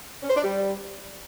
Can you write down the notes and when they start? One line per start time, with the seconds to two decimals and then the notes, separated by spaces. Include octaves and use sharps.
0.23 C#4
0.30 C5
0.37 D4
0.44 G3